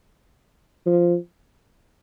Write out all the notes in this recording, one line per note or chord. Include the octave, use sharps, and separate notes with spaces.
F3